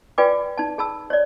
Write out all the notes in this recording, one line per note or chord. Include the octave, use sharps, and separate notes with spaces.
F4 B4 D5 G5 G#5 D6
D#4 A5
G#4 A5 B5 E6
C#5 D5